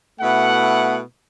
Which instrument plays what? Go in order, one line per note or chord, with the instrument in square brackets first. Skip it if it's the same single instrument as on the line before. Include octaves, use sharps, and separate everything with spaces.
[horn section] B2 A3 E4 F#5